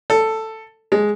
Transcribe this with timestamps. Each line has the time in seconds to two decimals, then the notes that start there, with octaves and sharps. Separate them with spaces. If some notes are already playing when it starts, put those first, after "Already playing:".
0.10 A4
0.92 G#3